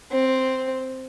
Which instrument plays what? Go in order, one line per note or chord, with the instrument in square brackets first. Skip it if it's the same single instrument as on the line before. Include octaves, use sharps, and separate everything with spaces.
[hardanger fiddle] C4